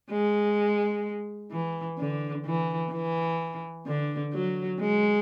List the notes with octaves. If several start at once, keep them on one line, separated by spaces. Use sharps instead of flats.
G#3
E3
D3
E3
E3
D3
F#3
G#3